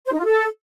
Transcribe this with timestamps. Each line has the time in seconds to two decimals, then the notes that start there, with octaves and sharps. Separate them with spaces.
0.06 C5
0.12 D#4
0.19 F4
0.25 A4